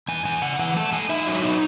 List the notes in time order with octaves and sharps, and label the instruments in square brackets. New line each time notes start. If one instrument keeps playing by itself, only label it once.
[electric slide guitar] E2 G#5
E2 G#5
C#3 F#5
E3 F#5
A3 A5
A3 G#5
D#4 E5
F#3
D#4